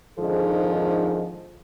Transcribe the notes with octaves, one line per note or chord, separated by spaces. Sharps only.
F2 G#2 D3 D#3 F3 G#4